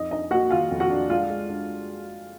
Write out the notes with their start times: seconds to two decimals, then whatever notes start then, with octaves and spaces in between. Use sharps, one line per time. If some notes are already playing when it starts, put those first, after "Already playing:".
Already playing: F2 D#4 D#5
0.11 D4 D#4 D#5
0.31 A#3 F#4 F#5
0.51 D#3 F4 F5
0.71 F2
0.80 F#4 F#5
0.90 D4
1.09 G#3 F4 F5
1.30 G#3
1.49 D4